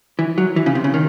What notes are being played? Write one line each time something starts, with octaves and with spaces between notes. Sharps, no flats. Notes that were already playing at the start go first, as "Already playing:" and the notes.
E3
F#3
E3
C#3
C3
C#3
D#3